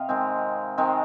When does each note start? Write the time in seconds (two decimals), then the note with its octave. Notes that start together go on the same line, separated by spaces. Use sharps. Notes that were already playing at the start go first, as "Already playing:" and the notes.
Already playing: C3 D#5 F5
0.09 D#3 G#3 C4
0.78 D#3 G#3 C4